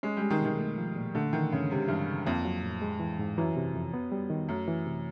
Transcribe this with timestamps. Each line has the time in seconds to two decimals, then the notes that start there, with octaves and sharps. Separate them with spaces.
0.03 G#3 C#4
0.17 G3
0.22 G#3
0.30 D#3
0.41 B2 D#3
0.59 A3
0.78 F3
0.96 A#2
1.15 D3 A3
1.33 D#3 E3
1.52 G2 C#3
1.70 C3 G#3
1.88 G2 E3
2.08 C#3
2.26 F2 A#3
2.45 F#3
2.63 A2
2.82 G#3
3.00 E3
3.19 G#2
3.38 F#2 E3
3.56 C3
3.75 F2
3.94 B3
4.12 G3
4.30 D#3
4.49 F#2 A3
4.68 E3
4.86 C3